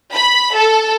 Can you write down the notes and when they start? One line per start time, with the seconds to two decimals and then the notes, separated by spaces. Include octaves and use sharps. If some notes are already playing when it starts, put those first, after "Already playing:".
0.12 B5
0.54 A4